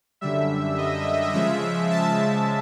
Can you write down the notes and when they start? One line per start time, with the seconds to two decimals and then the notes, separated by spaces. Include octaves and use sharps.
0.21 F#2 D3 G3 E5
0.77 D#5
1.33 C#3 F3 G#3 E5
1.90 A5